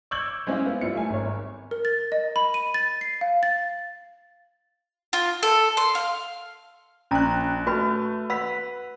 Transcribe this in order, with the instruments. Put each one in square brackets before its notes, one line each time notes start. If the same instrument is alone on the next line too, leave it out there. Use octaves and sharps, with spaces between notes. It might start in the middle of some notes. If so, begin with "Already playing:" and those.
[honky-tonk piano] C#6 D6 E6 G6 G#6 F#7
G#3 C4 C#4 E4 F5
B3
G3 E4 F4 C#7
A3 G#5
G#1 C#5
[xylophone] A#4
A6
D#5
B5
D#7
A6
C7
F5
A6
[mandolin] F4
A4
C6
F5
[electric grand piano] A#1 F#6 [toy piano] C#4 A#5
[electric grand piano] A3 [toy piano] F#4 B4 B5
[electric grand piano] B4 B6 [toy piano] F#5 B5 E6